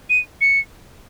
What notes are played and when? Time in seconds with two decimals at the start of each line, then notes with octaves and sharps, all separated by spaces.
0.10 D#7
0.41 C#7